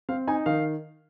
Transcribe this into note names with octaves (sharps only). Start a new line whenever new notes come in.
C4 F5
D#4 G#5
D#3 F5